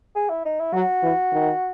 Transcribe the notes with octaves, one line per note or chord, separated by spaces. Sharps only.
G#4
E4
D#4
E4
F#3 F#4
E3
D#3